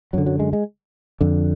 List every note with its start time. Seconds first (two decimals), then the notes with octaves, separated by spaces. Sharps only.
0.13 F#2 D3 F#3
0.26 F#3
0.39 G#3
0.53 G#3
1.21 F2 D3